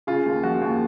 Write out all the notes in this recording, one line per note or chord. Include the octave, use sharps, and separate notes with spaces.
C#3 F4
D#2
F3 F#4
D#2